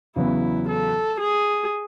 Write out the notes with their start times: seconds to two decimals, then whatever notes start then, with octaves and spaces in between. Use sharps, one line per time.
0.16 E2 C#3 F#3 B3 E4
0.68 A4
1.20 G#4